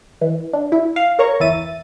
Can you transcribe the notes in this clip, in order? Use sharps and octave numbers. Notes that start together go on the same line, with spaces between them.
E3
D4
E4
F5
A#4 C#5 A#5 C#6
G1 E2 E3 E5 A6 D#7